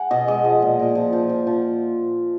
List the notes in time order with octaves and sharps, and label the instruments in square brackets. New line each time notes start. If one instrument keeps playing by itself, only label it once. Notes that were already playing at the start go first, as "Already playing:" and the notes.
Already playing: [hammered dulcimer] F#5 G#5
B2 D#5
G#3 D#5
F3
A#2
A#2
F3
F3
F3
F3